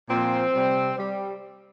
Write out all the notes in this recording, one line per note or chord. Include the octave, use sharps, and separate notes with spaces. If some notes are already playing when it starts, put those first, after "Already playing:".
A#2 F3 C4
C3 G3
G3